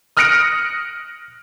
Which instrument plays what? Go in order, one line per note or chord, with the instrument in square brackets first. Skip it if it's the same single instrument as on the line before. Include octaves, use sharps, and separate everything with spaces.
[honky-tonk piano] D#6 F6 F#6 A#6 C#7 D7